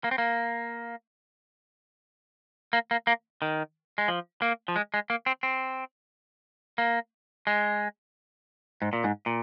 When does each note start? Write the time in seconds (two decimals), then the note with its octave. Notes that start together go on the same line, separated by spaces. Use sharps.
0.04 A#3
0.11 C4
0.18 A#3
2.73 A#3
2.91 A#3
3.07 A#3
3.42 D#3
3.98 G#3
4.08 F3
4.42 A#3
4.68 F3
4.76 G#3
4.94 G#3
5.10 A#3
5.26 C4
5.43 C4
6.78 A#3
7.47 G#3
8.82 G#2
8.93 A#2
9.04 G#2
9.26 A#2